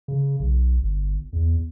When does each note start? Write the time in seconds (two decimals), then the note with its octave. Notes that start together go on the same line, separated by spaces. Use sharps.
0.08 C#3
0.39 B1
0.81 G1
1.33 E2